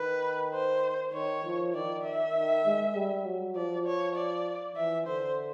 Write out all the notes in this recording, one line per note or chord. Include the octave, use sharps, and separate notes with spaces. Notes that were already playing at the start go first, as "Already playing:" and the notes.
Already playing: D#3 B4
C5
D#3 C#5
F3
D#3 D5
E5
D#3
G#3
G3
F#3
F3 D5
C#5
D5
E3 E5
D3 C5